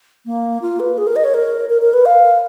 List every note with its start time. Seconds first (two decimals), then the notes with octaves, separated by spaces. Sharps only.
0.26 A#3
0.62 F4
0.80 B4
0.98 G#4
1.07 A#4
1.16 D#5
1.24 C#5
1.34 A#4
1.70 A#4
1.82 A#4
1.93 B4
2.06 F5